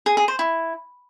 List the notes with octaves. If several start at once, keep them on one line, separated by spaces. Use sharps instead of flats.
G#4
G#4
C5
E4